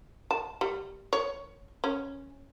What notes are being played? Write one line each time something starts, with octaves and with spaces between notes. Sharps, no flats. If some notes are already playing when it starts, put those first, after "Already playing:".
A5
G3
C#5
C#4